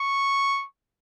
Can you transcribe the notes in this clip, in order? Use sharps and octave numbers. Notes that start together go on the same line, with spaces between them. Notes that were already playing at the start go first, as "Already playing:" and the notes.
Already playing: C#6